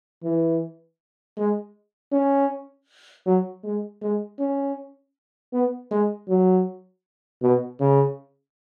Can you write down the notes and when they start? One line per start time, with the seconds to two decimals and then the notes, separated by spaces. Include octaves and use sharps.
0.23 E3
1.37 G#3
2.12 C#4
3.26 F#3
3.64 G#3
4.02 G#3
4.39 C#4
5.53 B3
5.91 G#3
6.28 F#3
7.42 B2
7.80 C#3